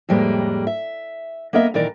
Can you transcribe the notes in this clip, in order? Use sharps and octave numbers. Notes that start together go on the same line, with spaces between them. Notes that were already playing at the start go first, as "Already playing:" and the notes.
F2 A2 G3 G#3 A#3
E5
A#3 B3 A#4 D#5 E5
A#2 D#3 E3 A#4 D5